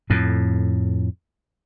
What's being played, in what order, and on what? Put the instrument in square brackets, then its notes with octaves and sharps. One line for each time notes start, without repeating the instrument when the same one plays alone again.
[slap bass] F2 A2